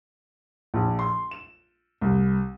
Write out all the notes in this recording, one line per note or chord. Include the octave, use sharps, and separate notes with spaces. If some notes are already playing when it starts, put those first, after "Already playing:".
A#1
C6
E7
C2